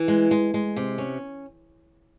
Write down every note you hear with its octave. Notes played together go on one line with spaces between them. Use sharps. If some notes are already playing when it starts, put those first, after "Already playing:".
Already playing: E3
G#3
G#3
G#3
C3
C#4